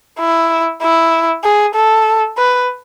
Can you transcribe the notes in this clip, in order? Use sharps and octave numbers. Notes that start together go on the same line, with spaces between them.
E4
E4
G#4
A4
B4